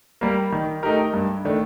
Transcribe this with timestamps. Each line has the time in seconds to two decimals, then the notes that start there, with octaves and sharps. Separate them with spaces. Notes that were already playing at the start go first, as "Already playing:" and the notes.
0.21 G3 A#3
0.52 D#3
0.83 A3 D#4 G4 A#4
1.14 G2
1.45 D#3 A3 D4